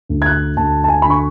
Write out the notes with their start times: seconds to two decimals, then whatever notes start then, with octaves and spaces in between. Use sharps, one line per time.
0.09 D2
0.22 G#6
0.26 F#6
0.57 D2 A5
0.84 A5
0.88 G#5
1.02 D3 B5
1.10 C#6